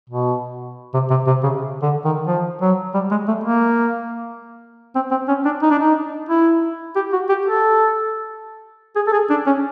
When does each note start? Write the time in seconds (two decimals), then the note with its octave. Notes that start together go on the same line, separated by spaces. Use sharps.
0.09 B2
0.94 C3
1.10 C3
1.27 C3
1.43 C#3
1.82 D3
2.04 D#3
2.27 F3
2.61 F#3
2.94 G3
3.11 G#3
3.28 A3
3.44 A#3
4.95 C4
5.11 C4
5.28 C#4
5.45 D4
5.62 D#4
5.70 D4
5.79 D#4
6.29 E4
6.95 G4
7.12 F#4
7.29 G4
7.46 A4
8.96 G#4
9.07 A4
9.13 G#4
9.30 D4
9.46 C#4